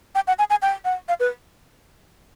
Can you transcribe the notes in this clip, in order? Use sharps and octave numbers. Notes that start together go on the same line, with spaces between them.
G5
F#5
G#5
G#5
G5
F#5
F5
B4